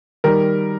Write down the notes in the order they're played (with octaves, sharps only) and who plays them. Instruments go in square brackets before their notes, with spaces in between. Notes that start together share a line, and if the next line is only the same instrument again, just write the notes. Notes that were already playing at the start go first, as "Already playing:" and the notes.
[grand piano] D#3 G3 A#4